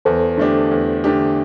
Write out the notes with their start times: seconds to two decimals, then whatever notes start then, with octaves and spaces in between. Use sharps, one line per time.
0.05 E2 A4 C5
0.38 D3 A3 D4 G4
0.71 E2
1.04 D3 A3 D4 G4